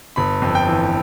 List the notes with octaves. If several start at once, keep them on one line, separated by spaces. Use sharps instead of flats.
G1 B5
F2
G5
E3